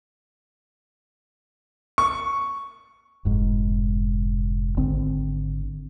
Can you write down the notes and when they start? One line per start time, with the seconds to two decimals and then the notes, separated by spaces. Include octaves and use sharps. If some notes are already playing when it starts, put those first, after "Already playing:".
1.98 C#6
3.25 F1 G#2
4.77 G#1 D3 C4